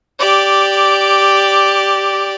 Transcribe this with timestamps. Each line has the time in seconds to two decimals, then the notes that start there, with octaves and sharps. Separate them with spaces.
0.19 G4 D5